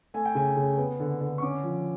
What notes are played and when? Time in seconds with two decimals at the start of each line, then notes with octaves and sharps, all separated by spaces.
0.14 A3 G#5
0.25 G5
0.35 C#3 G#5
0.57 C#3
0.78 B3
1.00 D3
1.21 D3
1.38 C#6
1.42 C#4 D6
1.64 F3